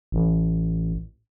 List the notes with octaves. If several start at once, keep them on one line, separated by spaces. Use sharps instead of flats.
A1